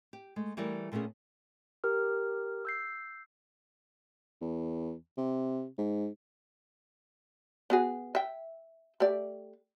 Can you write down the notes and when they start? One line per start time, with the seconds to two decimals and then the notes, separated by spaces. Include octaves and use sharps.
0.13 G4
0.36 G#3 A3
0.57 E3 G3 A3 A#4 B4 D5
0.92 A#2 A3 B3 C#4 G#4
1.84 G4 A#4 F6
2.65 E6 G6 C7
4.41 E2
5.17 C3
5.78 G#2
7.70 B3 F#4 G#4
8.15 E5 G5
9.00 A3 G4 D5